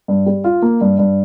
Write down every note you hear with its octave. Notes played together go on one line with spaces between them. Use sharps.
G2
G3
F4
A#3
G2
G2